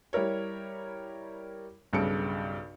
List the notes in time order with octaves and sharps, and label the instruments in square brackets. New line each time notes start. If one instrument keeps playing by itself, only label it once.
[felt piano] G3 E4 A#4 C#5
B1 G2 C#3 A4 C#7 D7